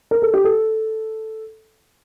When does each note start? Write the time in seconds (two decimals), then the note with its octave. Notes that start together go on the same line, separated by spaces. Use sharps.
0.11 A#4
0.22 A4
0.34 G4
0.44 A4